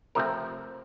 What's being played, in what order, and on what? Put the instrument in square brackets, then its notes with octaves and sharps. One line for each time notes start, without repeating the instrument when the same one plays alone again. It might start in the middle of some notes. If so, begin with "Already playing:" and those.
[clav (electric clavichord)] C3 F3 A3 C4 A#4